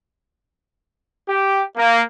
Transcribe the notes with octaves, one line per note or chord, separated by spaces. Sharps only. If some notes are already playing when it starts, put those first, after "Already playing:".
G4
A#3